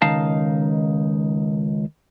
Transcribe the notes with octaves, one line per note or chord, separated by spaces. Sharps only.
C#2 D#3 D#4 F5 A5